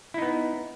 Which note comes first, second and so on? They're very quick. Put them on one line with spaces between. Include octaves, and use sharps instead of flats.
E4 D#4 B3